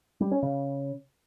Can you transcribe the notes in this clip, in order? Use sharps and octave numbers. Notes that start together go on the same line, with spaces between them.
G3
C#4
C#3